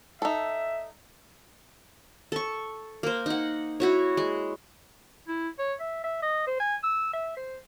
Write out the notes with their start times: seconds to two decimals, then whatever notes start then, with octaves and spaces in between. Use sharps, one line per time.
0.22 D#4 A4 E5
2.32 A4 C#6
3.03 A#3 C5
3.26 D#4 F#5
3.80 E4 F#4 C#5
4.17 G#3
5.28 E4
5.59 C#5
5.80 E5
6.04 E5
6.22 D#5
6.47 C5
6.60 G#5
6.84 E6
7.13 E5
7.36 C5